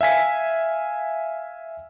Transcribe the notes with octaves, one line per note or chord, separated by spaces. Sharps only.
E5 F5 G#5 B6